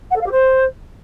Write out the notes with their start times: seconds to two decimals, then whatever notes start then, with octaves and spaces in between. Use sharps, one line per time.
0.11 F#5
0.16 A4
0.21 F5
0.26 G4
0.31 C5